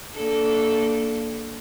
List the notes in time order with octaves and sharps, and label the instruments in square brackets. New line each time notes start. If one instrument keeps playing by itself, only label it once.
[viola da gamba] A#3 D4 A4